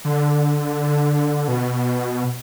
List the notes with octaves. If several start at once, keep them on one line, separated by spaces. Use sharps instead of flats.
D3
B2